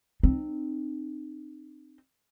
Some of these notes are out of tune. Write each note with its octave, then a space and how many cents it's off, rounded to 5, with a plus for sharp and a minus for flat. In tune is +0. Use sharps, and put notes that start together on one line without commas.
C4 +0 D#4 -35